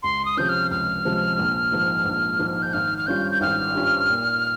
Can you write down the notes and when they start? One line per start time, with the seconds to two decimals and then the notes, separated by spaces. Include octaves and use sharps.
0.03 C#2 C6
0.25 D#6
0.37 C3 F3 G#3 C#4 G6
0.49 F6
0.71 C#2 F6
1.05 C3 F3 G#3 C#4
1.39 A#1
1.72 G#2 F3 G#3
2.06 A#1
2.39 G#2 F3 G#3
2.62 G6
2.73 G#1 F6
2.98 F6
3.07 G2 G3 C#4 F4 G6
3.32 G6
3.41 G#1 F6
3.75 G2 G3 C#4 F4
4.09 A#2